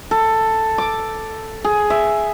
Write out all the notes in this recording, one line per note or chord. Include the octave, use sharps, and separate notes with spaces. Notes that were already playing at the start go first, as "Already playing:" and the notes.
A4
D6
G#4
E5